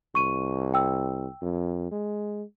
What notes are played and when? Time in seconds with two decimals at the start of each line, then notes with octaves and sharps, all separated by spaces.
0.15 C2 C#6 D#7
0.74 G5 E6
1.42 F2
1.91 G#3